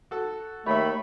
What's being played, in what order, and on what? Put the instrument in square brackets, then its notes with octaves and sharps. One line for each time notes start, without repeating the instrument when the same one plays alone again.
[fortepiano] F#4 A4
[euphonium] D#2 [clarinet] A3 [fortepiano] C#5 E5 [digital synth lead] B5